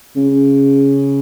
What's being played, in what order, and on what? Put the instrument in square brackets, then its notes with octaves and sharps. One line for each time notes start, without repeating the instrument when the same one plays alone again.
[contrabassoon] C#3